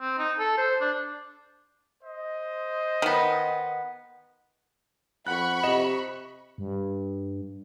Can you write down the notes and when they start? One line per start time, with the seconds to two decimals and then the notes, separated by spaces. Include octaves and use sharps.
0.01 C4
0.18 D#4
0.39 A4
0.57 C5
0.81 D4
2.04 C5 D#5
3.02 D#3 B3
5.27 F2 F#5 B5 C#6 F#6
5.64 C3 D#5 E7
6.58 G2